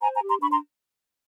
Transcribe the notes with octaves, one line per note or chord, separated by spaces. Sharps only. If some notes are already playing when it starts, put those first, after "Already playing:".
C5 G#5 A#5
G#5 A#5
G4
A#5 C6
D4 B5 C#6
A#5 C6